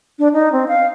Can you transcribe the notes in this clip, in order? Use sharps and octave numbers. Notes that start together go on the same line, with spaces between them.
D4
D#4
C4
F5